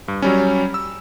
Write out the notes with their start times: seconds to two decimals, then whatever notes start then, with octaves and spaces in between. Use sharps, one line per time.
0.08 G2
0.22 F#3 G3 C#4
0.74 E6